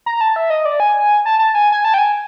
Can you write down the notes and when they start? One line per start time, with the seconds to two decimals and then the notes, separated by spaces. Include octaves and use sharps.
0.06 A#5
0.21 A5
0.36 E5
0.50 D#5
0.65 D5
0.80 G#5
1.25 A5
1.39 A5
1.55 G#5
1.72 G#5
1.84 A5
1.94 G5
1.98 G#5